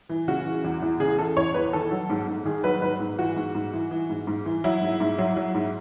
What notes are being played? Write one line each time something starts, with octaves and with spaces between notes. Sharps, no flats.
E3
C#3 F#4
E3
E2
E2
C#3 G#4
E3 A4
E2 C#5
E2 B4
D#3 A4
F#3
G#2
G#2
D#3 G#4
F#3 B4
G#2 B4
G#2
E3 F#4
G#2
G#2
E3
E3
G#2
G#2
E3
F#3 E4
G#2
G#2
F#3
F#3
G#2